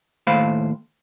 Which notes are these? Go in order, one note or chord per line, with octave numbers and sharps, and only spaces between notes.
D#2 A2 A3 C5 F5 B5